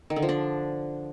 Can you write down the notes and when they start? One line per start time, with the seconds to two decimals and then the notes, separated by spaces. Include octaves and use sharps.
0.10 D#3
0.16 D3
0.22 F3
0.29 D4